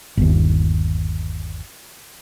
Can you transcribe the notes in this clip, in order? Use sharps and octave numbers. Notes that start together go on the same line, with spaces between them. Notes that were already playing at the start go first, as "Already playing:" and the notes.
G1 D#2